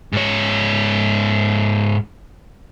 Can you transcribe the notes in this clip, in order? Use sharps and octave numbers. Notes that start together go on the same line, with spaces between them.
G#2 C#5